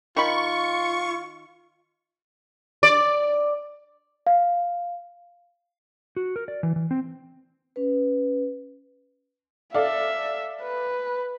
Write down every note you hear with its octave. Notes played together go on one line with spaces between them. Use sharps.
D#3 F4 B5 C#6
D5
F5
F#4
A#4
D5
E3
E3
C4
C#4 B4
A4 D5 E5 F5
B4